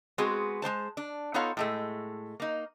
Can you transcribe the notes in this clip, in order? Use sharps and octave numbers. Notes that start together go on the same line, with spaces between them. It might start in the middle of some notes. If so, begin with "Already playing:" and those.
G#3 B3 C4 F#4 G#4
G#3 C4 C5 A5
D4
B3 D#4 F4 A4 C#5 F5
A2 G#3 A3
A#3 D#4